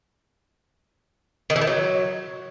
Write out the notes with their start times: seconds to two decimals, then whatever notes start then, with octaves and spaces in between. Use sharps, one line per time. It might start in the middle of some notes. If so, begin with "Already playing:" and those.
1.50 D#3
1.56 E3
1.61 D#3
1.67 F#3